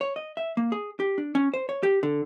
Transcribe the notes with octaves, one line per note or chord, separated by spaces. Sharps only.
C#5
D#5
E5
A#3
G#4
G4
D4
C#4
C5
C#5
G4
D3